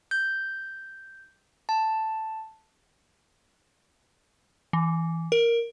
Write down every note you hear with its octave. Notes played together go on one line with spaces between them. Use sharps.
G6
A5
E3
A#4